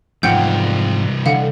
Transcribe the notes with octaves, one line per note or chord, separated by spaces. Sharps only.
C2 F2 G#2 E3 F4 F#5 G5 G6
D3 F5 F#5